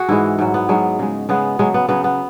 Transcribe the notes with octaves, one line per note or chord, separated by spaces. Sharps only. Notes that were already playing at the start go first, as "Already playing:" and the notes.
Already playing: F#4 G#4
G#2 E3 G#3 E4
G#2 F#3
B3
G#2 F#3 G#3
C#3 G#3
C#3 G#3 B3
C#3 F#3 G#3
B3
C#3 F#3 B3
B3